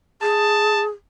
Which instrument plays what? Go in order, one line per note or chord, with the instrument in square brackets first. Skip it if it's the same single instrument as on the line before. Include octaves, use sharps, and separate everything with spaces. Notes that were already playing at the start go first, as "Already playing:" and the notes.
[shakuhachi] G#4 [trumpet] A5